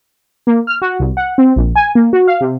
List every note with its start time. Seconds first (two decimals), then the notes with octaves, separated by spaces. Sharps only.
0.47 A#3
0.67 F6
0.82 F#4
0.99 C2
1.17 F#5
1.38 C4
1.56 A#1
1.75 G#5
1.95 A#3
2.13 F#4
2.27 F5
2.41 C3